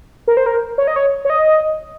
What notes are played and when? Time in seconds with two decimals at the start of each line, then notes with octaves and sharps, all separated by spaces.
0.28 A#4
0.37 C5
0.46 A#4
0.78 C#5
0.87 D#5
0.96 C#5
1.25 C#5
1.30 D#5